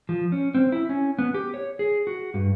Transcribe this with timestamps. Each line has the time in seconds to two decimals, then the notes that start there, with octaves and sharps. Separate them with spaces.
0.09 F3
0.32 C#4
0.55 C4
0.72 E4
0.89 C#4
1.19 B3
1.34 G4
1.54 C#5
1.79 G#4
2.07 F#4
2.34 G2